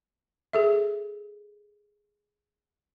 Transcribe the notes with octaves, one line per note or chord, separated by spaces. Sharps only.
G#4 A4 E5